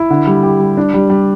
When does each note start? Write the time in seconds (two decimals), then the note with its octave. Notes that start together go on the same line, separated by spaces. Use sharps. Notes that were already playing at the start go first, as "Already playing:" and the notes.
Already playing: E4
0.10 D3
0.27 G3
0.43 G4
0.60 G3
0.77 D4
0.94 G3
1.10 G3